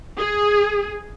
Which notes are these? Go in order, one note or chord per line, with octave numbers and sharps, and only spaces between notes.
G#4